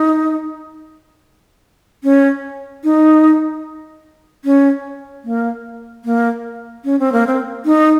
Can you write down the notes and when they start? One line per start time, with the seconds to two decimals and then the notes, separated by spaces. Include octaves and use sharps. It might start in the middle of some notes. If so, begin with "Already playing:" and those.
Already playing: D#4
2.04 C#4
2.84 D#4
4.45 C#4
5.24 A#3
6.05 A#3
6.85 C#4
6.99 C4
7.12 A#3
7.27 C4
7.65 D#4